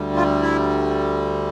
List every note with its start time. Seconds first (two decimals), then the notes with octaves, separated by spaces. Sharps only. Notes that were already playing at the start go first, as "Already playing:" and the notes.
Already playing: D2 D3 G3
0.16 F4
0.42 E4